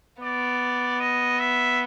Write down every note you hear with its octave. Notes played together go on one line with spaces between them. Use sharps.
B3 D5
D#5
E5